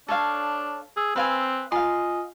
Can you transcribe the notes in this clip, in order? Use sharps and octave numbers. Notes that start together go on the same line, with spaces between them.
D4 A4 C#5 F5
G#4 E6
C4 B4 F5 G#5
F4 D#5 F5 G#5 C6